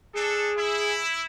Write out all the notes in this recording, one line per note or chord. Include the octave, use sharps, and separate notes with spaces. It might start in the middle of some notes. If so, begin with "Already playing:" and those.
D4 G#4 A4
E4